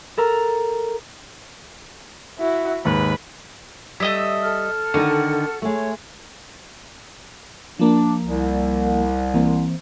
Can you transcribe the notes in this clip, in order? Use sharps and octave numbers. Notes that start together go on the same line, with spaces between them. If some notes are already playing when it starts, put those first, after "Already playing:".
A4 A#4 A#5
E4 F#4
D#2 G#2 B4 B5
G3 A3 D#5 E5
A4 F6
D3 D#3 D#4 F#4
G#3 A3 C#5
F3 A#3 D4
C2
E3 A#3 C4